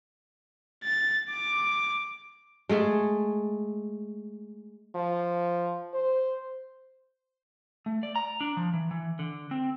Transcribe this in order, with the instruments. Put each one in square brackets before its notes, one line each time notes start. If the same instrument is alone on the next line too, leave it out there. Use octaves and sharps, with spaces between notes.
[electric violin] A6
D6
[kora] G#3 A3 G#4 A4
[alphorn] F3
C5
[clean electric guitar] A3
D5
A#5
D4
F3
E3
E3
D3
C4